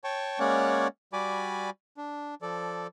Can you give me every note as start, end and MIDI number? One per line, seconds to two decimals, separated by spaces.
0.04 0.39 73
0.04 0.39 79
0.04 0.39 81
0.04 0.39 85
0.39 0.88 56
0.39 0.88 58
0.39 0.88 61
0.39 0.88 73
0.39 0.88 74
0.39 0.88 78
1.13 1.70 55
1.13 1.70 66
1.13 1.70 74
1.13 1.70 80
1.13 1.70 83
1.13 1.70 86
1.97 2.35 62
2.42 2.87 53
2.42 2.87 69
2.42 2.87 74